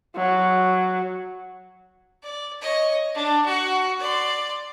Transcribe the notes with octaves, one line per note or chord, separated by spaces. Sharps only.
F#3
D5
C#5 D#5
D4
F#4 F#5
D5 C6